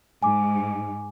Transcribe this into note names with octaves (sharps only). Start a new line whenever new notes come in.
G#2 G#5 D6